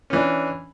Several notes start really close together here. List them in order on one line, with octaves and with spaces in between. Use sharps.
C#4 E3 D4